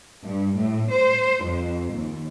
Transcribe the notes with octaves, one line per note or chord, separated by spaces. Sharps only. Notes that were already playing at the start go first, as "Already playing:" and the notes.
G2
A2
C5
F2
D#2